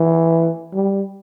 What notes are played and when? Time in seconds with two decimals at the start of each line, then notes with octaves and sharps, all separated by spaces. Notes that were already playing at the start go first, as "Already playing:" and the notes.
Already playing: E3
0.73 G3